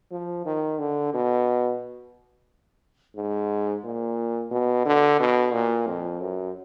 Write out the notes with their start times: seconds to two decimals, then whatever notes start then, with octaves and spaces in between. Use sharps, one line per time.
0.11 F3
0.45 D#3
0.79 D3
1.14 B2
3.16 G#2
3.84 A#2
4.51 B2
4.86 D3
5.20 B2
5.53 A#2
5.87 F2
6.21 F#2